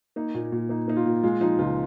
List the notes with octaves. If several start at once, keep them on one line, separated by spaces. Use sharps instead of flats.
A#3 D#4
A#2
A#2
A#3 D#4
A#3 D#4
F4
A#2
G#3 F4
F3 D#4
C#2 F4